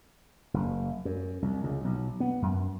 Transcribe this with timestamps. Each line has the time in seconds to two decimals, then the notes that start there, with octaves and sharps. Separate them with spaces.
0.54 F#1
1.05 F#2
1.42 C2
1.64 C#2
1.85 B1
2.20 B3
2.42 F#2